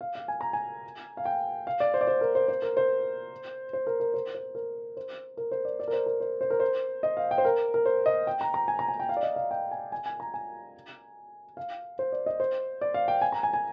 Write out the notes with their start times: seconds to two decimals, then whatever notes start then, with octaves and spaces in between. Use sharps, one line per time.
0.01 F5
0.15 F5
0.28 G#5
0.41 A#5
0.53 G#5
1.17 F5
1.25 G5
1.67 F5
1.80 D5
1.94 C5
2.01 D5
2.07 C5
2.21 A#4
2.35 C5
2.48 C5
2.62 A#4
2.77 C5
3.73 C5
3.87 A#4
4.00 A#4
4.14 C5
4.35 C5
4.55 A#4
4.97 C5
5.37 A#4
5.52 C5
5.65 D5
5.80 D5
5.88 A#4
5.93 C5
6.06 A#4
6.20 C5
6.41 C5
6.50 A#4
6.60 C5
7.03 D#5
7.17 F5
7.31 G5
7.38 C5
7.45 A#4
7.74 A#4
7.86 C5
8.06 D#5
8.27 G5
8.41 A#5
8.54 A#5
8.68 G#5
8.79 A#5
8.89 G#5
9.00 G5
9.09 F5
9.17 D5
9.23 D#5
9.36 F5
9.51 G5
9.71 G#5
9.92 G#5
10.06 G#5
10.20 A#5
10.34 G#5
11.57 F5
11.99 C5
12.12 D5
12.26 D#5
12.40 C5
12.81 D5
12.94 F5
13.08 G5
13.22 G#5
13.32 A#5
13.43 G#5
13.53 G#5